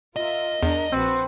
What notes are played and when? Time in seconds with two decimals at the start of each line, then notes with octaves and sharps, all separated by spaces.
0.16 F4 A#4 D#5 E5
0.63 E2 D4 A#4
0.92 A#1 C4 F#4 B4